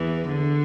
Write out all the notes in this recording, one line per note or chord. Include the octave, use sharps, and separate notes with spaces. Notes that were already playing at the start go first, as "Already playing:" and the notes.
Already playing: E2 E3
D3